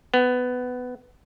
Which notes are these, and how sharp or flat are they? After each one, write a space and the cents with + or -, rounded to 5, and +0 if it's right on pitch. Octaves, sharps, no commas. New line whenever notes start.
B3 +15